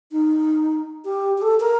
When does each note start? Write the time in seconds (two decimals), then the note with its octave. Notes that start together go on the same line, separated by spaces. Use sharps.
0.12 D#4
1.05 G4
1.38 G4
1.42 A4
1.60 A#4